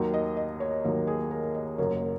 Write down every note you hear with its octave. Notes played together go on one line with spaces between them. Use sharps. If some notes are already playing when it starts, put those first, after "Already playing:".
Already playing: D#2 D#3 F#3
D#5
D#5
C#5
D#2 D#3 F#3
G#4
A#4
D#5
F#1 F#2 F#3 A#3 C#5